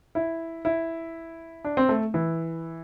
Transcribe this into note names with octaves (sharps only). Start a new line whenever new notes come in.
E4
E4
D4
C4
A3
E3